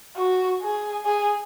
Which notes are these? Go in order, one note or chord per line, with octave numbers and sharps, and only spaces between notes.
F#4
G#4
G#4